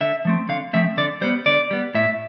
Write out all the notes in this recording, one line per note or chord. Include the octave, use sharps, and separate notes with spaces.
D3 E5
F3 A3 C4
D3 F5
F3 A3 C4 E5
D3 D5
G3 B3 C5
D3 D5
G3 B3
A2 E5